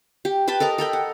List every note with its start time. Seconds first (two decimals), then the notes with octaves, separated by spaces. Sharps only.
0.25 G4
0.47 B4 G5 A5 B5
0.60 A4 A#4 D#5 A#5
0.78 A4 A#4 G5 B5
0.93 F#5